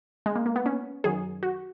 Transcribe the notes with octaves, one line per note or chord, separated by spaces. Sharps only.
G#3
A#3
A#3
B3
C#4
F#2 D#3 F#3 G#4
F#4